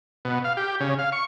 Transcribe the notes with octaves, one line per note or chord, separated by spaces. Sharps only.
B2
F5
G4
C#3
F5
C#6